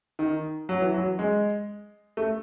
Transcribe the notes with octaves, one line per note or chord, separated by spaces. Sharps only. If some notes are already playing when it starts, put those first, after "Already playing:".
D#3
F#3
E3
F#3
G#3
A3